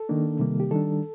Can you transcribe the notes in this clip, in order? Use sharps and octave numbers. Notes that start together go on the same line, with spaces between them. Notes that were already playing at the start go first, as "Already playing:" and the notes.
Already playing: A4
D#3 A#3 D4
C3 D#3 G3 A#3
G4
D#3 G3 D4 A4